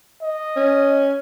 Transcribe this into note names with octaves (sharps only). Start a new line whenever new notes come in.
D#5
C#4